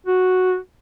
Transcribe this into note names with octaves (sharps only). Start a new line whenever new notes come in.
F#4